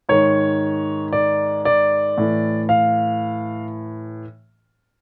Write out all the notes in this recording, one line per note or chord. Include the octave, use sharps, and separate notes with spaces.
G#2 D#3 C#5
D5
D5
A2 E3
F5